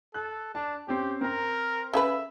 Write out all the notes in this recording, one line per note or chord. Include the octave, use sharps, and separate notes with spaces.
A4 F#6
D4 A5
C4 C#4 G4
C4 A#4 A#5
C#3 F#4 B4 E5